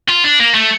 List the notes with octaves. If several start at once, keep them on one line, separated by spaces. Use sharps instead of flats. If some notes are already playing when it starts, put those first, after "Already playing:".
F4
D4
A#3
A3